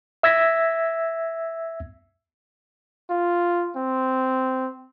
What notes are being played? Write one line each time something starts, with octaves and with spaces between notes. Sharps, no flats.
E5 E6 G#6 A#6 B6
F4
C4